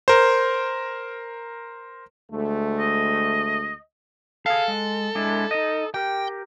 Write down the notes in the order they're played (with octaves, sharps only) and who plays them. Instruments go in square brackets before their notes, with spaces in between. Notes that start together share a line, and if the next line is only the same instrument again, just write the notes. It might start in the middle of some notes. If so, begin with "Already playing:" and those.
[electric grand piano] A#4 C5
[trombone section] D2 G#3 A3
[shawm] D#5
[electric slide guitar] G#4 F5 [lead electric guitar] A4
[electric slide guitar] G#3
G#3 D4 E4
D#4 D#5
[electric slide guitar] G4 A#4 [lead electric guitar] G5